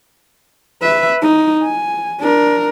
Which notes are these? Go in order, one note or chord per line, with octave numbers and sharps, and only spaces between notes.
B4 E5
D#4
G#5
D4 A#4